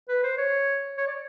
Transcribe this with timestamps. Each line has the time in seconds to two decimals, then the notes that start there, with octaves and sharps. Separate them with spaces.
0.08 B4
0.23 C5
0.38 C#5
0.97 C#5
1.07 D5